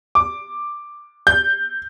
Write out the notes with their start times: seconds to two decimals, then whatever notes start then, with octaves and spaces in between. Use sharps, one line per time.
0.15 D6
1.27 G6